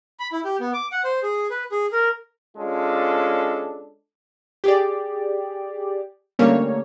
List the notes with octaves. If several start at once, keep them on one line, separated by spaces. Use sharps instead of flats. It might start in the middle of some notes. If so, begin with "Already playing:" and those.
B5
E4
G4
B3
D6
F#5
C5
G#4
B4
G#4
A#4
G#3 C#4 D4 F4 A4
G4 G#4 D5
D3 G3 A3 A#3 C#4 C#5